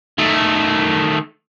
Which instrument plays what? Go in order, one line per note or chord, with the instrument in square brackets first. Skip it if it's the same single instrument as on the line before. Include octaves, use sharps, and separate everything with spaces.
[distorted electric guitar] D#3 A3